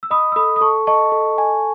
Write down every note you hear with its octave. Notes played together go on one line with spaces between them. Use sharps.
E6
D#5 B5 D#6
E6
A4 B5 D#6
D#6
A4 A5 C#6
D#5 A5 C#6
A4
G#5